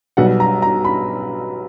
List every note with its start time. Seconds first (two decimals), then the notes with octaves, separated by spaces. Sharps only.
0.17 B1 B2 G3 B3 F#5
0.40 A#5
0.62 A#5
0.85 B5